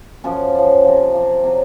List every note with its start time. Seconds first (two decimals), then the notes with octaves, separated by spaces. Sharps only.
0.24 F#2 F3 C#4
0.55 F#2 F3
0.84 C3 F3
1.14 C3 F3
1.44 C3 F#3 C4